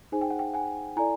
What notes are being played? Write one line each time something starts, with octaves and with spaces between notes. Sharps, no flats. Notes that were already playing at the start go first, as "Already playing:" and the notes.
D#4 G#4 C5 G#5
G5
F#5
G5
F#5 G#5
E4 A4 D5 G#5 A#5